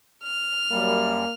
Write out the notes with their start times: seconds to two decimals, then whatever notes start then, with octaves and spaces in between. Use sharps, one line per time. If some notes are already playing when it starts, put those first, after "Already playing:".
0.24 F6
0.71 F#2 G3 A#3